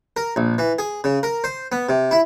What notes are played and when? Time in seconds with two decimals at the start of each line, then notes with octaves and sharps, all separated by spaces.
0.17 A#4
0.36 A#1
0.58 E3
0.79 G#4
1.04 C#3
1.23 A#4
1.44 C5
1.72 B3
1.89 C3
2.11 E4